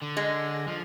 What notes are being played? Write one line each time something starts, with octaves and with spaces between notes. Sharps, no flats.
D3
G#3
F3